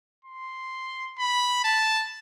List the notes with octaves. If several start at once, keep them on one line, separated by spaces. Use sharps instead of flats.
C6
B5
A5